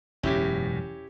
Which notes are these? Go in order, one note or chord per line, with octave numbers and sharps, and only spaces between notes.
E1 F#2 A2 C#4 E4 G4